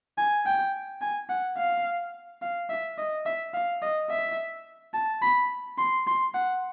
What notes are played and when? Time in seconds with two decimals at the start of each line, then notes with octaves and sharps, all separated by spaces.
0.18 G#5
0.46 G5
1.02 G#5
1.29 F#5
1.58 F5
2.42 F5
2.70 E5
2.98 D#5
3.26 E5
3.54 F5
3.82 D#5
4.10 E5
4.94 A5
5.22 B5
5.78 C6
6.07 C6
6.34 F#5